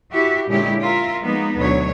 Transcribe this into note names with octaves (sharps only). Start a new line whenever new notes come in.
E4 F#4 G4 E5
A#2 D3 G#3 C#4 E4 G4
F4 A#4 E5
F3 G#3 A#3 B3 D#4
D2 B2 F#3 C#5